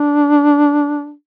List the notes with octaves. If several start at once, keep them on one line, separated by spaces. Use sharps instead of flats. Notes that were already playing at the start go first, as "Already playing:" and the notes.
Already playing: D4